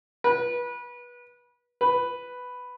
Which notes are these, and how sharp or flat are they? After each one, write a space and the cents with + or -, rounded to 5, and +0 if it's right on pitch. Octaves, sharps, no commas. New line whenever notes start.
B4 -25
B4 +5